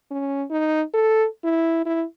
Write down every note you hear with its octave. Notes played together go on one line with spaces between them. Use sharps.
C#4
D#4
A4
E4
E4